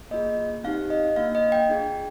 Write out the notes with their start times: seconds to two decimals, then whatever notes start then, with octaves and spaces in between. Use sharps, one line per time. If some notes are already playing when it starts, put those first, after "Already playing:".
0.11 A#3 F4 G#4 D#5
0.64 C4 D#4 G4 F5
0.90 D#5
1.16 A#3 D4 F4 F5
1.35 D#5
1.52 G5
1.69 D4 F4 G#4